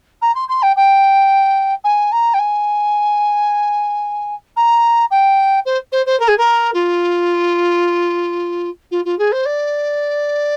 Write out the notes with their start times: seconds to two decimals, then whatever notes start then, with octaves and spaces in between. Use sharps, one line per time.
0.21 A#5
0.34 C6
0.48 C6
0.62 G5
0.76 G5
1.84 G#5
2.12 A#5
2.33 G5
2.38 G#5
4.56 A#5
5.10 G5
5.65 C5
5.92 C5
6.06 C5
6.19 A#4
6.28 G#4
6.37 A#4
6.73 F4
8.91 F4
9.05 F4
9.18 G#4
9.32 C5
9.45 D5